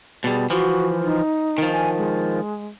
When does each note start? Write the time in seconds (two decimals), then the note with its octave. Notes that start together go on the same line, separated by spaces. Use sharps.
0.24 B2 G3 G#4
0.50 E3 F3 F#4
1.05 D#4
1.58 D#3 F3
1.72 G#5
1.98 G#3